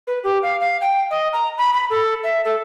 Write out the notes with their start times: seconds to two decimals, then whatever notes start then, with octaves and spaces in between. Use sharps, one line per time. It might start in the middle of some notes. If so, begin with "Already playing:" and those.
0.07 B4
0.24 G4
0.43 F5
0.60 F5
0.81 G5
1.11 D#5
1.33 A#5
1.58 B5
1.73 B5
1.90 A4
2.24 E5
2.45 A4